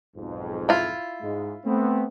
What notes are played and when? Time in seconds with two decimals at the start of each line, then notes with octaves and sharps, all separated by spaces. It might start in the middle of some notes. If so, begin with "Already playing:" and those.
0.16 B1 F2 G#2
0.69 E4 F4
1.22 G#2 G#3
1.65 A3 B3 C4